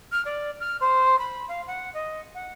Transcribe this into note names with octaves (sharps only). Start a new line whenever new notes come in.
F6
D5
F6
C5
B5
F5
F#5
D#5
F#5